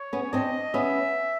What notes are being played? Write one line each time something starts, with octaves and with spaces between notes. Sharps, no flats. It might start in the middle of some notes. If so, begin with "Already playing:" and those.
Already playing: C#5
B3 C#4
C4 D4 D#5
B3 C#4 E5